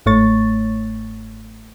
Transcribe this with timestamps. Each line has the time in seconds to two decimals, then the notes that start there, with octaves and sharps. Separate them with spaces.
0.06 G1 G#2 A3 C#5 C#6 A6